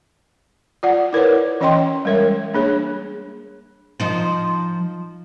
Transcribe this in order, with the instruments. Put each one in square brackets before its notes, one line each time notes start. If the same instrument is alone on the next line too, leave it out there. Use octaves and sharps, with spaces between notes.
[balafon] F4 D5 F#5
E4 A#4 B4 C#5
E3 C#4 C#5 D#5 G5 C6
G3 G#3 A#4 C#5 E5
A#3 D4 G#4 C#5
[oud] F3 D#4 C5